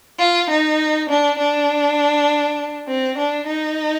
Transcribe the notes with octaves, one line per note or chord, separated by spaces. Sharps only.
F4
D#4
D4
D4
C4
D4
D#4